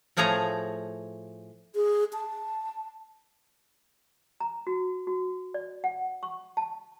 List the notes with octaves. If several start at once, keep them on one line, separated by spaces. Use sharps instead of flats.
A2 F3 A3 G#4 C#5 A#5
G#4
A5
A#5
F#4
F#4
D5
F#5
C#6
A5